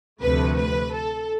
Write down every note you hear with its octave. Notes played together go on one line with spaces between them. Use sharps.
D2 C3 F3 A3 B4
B4
A4